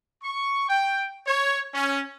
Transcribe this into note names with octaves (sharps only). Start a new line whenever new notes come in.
C#6
G5
C#5
C#4